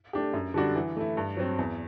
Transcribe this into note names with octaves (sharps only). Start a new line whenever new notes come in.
A3 D4 G4
F#2
D3 G3 D4 F#4
E3
A3 E4
G2
F#3 C4
E2